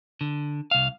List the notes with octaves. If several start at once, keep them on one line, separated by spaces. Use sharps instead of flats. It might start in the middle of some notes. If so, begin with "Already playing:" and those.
D3
C2 F5